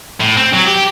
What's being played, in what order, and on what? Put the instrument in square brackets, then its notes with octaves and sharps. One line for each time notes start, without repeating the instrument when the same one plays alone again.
[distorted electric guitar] A2
C4
F#3
G4